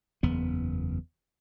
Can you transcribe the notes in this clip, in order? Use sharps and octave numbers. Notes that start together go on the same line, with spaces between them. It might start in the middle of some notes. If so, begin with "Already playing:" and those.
F#1 E2 B3